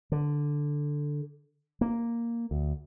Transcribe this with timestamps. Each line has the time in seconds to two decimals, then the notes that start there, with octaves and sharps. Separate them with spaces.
0.12 D3
1.81 A#3
2.51 D2